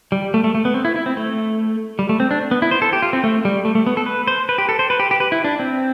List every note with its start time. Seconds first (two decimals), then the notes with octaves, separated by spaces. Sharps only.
0.12 G3
0.34 A3
0.44 A3
0.55 A3
0.65 B3
0.74 C4
0.85 E4
0.96 E4
1.06 C4
1.17 A3
1.99 G3
2.09 A3
2.20 C4
2.31 D4
2.51 B3
2.62 E4
2.71 C5
2.82 A4
2.93 G4
3.02 F4
3.13 C4
3.24 A3
3.45 G3
3.65 A3
3.75 A3
3.86 B3
3.97 A4
4.06 B4
4.27 C5
4.49 B4
4.58 G4
4.69 A4
4.79 C5
4.90 B4
5.00 G4
5.11 G4
5.20 B4
5.32 E4
5.45 D4
5.60 C4